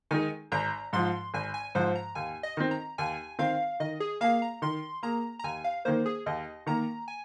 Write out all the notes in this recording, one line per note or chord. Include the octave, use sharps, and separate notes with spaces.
D#3 G#3 D#4 G#5
G#1 A#5
G#2 F3 C6
G#1 G#5
G#5
G#2 F3 C5
A#5
D#2 G#5
D#5
D#3 C4
A#5
D#2 G#5
D#3 C4 F5
D#3 D#5
G#4
A#3 G#4 F5
A#5
D#3 C6
A#3 G#4 A#5
A#5
D#2 G#5
F5
D#3 A#3 C5
G#4
D#2 D#5
D#3 A#3 A#5
G#5